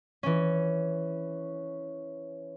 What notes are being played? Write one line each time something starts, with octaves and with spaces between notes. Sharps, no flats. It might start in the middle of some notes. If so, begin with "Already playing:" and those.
E3 C#4